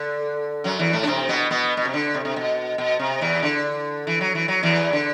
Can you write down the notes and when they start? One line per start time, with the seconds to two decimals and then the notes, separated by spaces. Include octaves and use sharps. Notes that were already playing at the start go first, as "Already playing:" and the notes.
Already playing: D3
0.64 F#2 F#3
0.79 E2 E3
0.93 A2 A3
1.03 D4
1.07 C3 C4
1.29 B2 B3
1.51 B2 B3
1.77 B2
1.85 C3
1.94 D3
2.15 C3
2.25 C3
2.36 B2
2.78 B2
2.99 C3
3.21 E2 E3
3.43 D3
4.07 E3
4.21 F#3
4.35 E3
4.48 F#3
4.63 E2 E3
4.93 D3